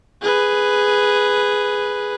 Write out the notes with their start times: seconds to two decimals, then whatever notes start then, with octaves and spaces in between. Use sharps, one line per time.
0.22 G#4 B4